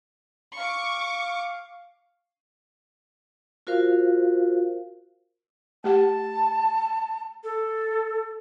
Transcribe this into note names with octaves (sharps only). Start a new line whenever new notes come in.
F5 C#6 D6
F4 F#4 A#4 C5 F5
A3 G4 F#5 A5
A4